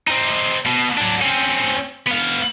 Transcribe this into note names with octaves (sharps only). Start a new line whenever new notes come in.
C4 D#4
B2
F#3 D4
C4 C#4
B3 F5